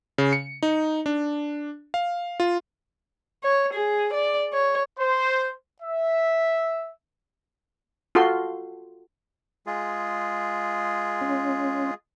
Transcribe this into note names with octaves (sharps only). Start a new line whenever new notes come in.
C#3
C#7
D#4
D4
F5
F4
C#5
G#4
D5
C#5
C5
E5
F4 F#4 A4 C6
G#3 F4 G#4
C#4